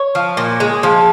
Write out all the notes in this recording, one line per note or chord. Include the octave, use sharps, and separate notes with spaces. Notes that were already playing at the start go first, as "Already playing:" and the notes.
Already playing: C#5
F3
A#2
G#3
F3